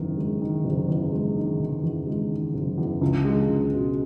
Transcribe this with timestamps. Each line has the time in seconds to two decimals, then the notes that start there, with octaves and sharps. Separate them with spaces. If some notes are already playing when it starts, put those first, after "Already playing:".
Already playing: F#1 E2 D#3
0.18 G#3
0.42 D#3
0.65 F#1
0.88 E2
1.12 G#3
1.36 D#3
1.60 F#1
1.83 E2
2.07 G#3
2.31 D#3
2.54 F#1
2.78 E2
3.02 C#2
3.25 G#3
3.49 C#2
3.72 B2